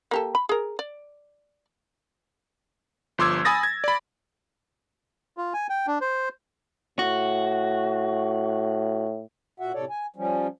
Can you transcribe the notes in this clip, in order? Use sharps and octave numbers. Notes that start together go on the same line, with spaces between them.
A#3 G4 A4
B5
G#4 A#4
D5
G1 F3 C6 D6 E6 G#6
G#5 B5 D#6 A6 A#6
G#6
D5 B5
F4
G#5
G5
D4
C5
A2 F#4
A#2 F#4 E5 F#5
A2 C3 A4 C#5 D5
G#5
F3 G3 C#4